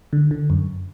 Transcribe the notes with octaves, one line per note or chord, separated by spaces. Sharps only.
D3
D3
F#2